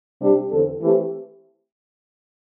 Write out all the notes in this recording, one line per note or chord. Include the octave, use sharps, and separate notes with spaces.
C3 G3 D4 G4
E2 D3 C4 A4
E3 A3 C4 G4